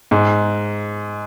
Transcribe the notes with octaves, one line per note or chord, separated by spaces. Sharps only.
G#2